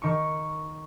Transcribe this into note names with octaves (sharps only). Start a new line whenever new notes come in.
D#3 C#6